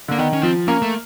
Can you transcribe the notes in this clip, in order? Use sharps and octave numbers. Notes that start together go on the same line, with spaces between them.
D3 A#3
D#3 B3
C#4
F3 C4
A#3 C#4
A3